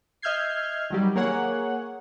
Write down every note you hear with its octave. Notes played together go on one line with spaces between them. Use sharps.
D#5 E5 F6 G6 G#6 C7
D#3 F#3 G3
A#3 G#4 C#5 F#5